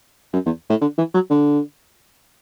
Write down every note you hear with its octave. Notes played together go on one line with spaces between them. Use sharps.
F#2
E2
A2
D3
E3
F#3
D3